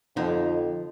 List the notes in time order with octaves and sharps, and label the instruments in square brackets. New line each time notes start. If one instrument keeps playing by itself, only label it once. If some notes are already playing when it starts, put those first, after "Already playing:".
[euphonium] F2 [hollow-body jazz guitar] D3 F3 D#4